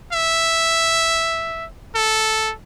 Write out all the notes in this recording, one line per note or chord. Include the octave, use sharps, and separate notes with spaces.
E5
A4